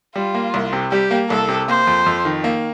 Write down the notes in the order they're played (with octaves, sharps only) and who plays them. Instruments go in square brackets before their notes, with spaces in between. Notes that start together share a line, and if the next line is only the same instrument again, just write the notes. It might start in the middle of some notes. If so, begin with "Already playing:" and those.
[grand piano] G3 [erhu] F4
[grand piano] A#3
C2
C3
[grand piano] G3 [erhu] G4
[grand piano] A#3
[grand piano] C2 [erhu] A4
[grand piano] C3
[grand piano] A#3 [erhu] C5
[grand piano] F2
F2
D#3
A#3